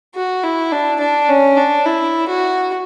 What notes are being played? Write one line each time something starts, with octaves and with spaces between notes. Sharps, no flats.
F#4
E4
D4
D4
C#4
D4
E4
F#4